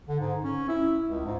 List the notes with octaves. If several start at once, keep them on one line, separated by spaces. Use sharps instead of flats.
D3
G#2
C#4
E4
C#2
G#2